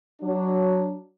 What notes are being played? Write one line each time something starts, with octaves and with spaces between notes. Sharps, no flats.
F#3 D4